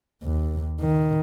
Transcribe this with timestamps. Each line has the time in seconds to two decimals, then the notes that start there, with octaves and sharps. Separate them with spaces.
0.23 D#2
0.80 D#3